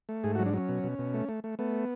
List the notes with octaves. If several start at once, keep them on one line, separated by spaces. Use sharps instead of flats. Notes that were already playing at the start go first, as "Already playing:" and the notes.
A3
G#2 G#4
F#4
F#3
D4
F#3 C#4
B2
B2
B2
A3
A3
A3
A3 B3